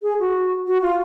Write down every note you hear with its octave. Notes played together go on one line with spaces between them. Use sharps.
G#4
F#4
F#4
F4